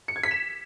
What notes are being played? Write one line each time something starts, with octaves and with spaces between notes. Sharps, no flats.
C#7
G#6
B6
E7